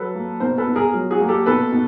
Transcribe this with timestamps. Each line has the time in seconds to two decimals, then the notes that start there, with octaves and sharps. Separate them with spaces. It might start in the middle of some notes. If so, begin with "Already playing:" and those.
Already playing: F#3 A4 B4
0.15 A#3
0.40 B2 A#4 C5
0.58 A4 B4
0.67 B2
0.76 G#4 A#4
0.94 F#3
1.11 F#4 G#4
1.20 A#3
1.28 G4 A4
1.46 B2 A4 B4
1.72 B2